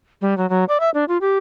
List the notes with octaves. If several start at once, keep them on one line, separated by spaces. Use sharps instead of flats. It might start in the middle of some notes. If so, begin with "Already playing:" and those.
G3
F#3
F#3
D5
E5
D4
F4
G4